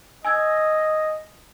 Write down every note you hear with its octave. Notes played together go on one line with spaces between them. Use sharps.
D#5 G#5 E6 G#6